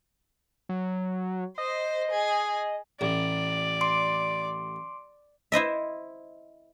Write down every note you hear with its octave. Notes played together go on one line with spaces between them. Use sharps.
F#3
C5 D#5
G#4
A1 D5
C6 D6 D7
E4 C5 D#5 E5